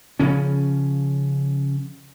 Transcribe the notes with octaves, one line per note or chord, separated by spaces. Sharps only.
C#3 F3 C#4